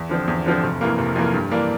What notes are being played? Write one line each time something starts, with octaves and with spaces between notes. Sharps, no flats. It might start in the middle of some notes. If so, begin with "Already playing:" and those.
Already playing: E2
D3 F3 C4
E2
D3 F3 C4
F1
F2 E3 A#3
F1
F2 E3 A#3
G2
E3 A#3 D4